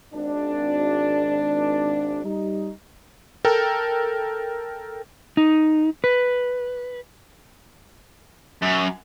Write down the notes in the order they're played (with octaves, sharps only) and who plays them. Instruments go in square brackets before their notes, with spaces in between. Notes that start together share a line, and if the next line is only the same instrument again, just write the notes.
[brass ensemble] G#1 D4
G3 D#4
[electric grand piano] A4 A#4 G5
[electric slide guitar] D#4
B4
[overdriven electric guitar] F#2